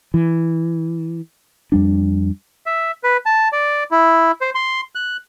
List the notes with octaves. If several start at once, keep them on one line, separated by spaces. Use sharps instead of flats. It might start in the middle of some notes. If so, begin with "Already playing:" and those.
E3
F2 G3 D4
E5
B4
A5
D5
E4
C5
C6
F#6